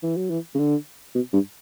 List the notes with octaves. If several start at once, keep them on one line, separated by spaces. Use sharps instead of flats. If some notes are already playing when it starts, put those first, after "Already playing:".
E3
F#3
E3
C#3
D3
B2
G2